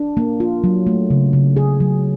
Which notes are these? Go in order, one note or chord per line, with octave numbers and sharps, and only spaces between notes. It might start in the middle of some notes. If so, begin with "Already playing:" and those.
Already playing: D4
A#3
F4
F#3
A3
C#3
C#3
G#4
F#3